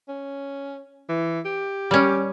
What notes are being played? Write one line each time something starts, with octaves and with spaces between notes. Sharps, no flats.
C#4
E3
G4
G3 C#4